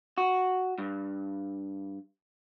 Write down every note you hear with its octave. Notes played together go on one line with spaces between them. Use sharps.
F#4
G2